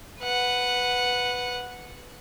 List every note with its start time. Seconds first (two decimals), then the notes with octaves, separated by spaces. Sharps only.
0.21 B4 F#5